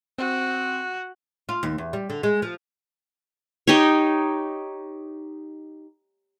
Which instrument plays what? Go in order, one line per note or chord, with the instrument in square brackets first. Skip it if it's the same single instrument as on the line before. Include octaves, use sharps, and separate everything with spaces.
[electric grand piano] C4 [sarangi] F#4
[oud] F4
D#2
E2
G3
D3
G#3
F3
[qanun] D#4 G4 C#5